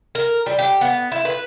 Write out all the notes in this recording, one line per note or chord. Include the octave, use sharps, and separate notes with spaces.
A#4
G3
G4
B3
E4
B4